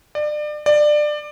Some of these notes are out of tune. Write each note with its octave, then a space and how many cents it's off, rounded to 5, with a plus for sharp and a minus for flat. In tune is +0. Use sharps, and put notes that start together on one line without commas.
D5 +30
D5 +20